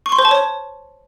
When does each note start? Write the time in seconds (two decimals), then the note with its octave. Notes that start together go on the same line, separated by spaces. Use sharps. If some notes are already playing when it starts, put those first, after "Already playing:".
0.06 C#6
0.12 C6
0.19 C5
0.25 A5
0.31 C#5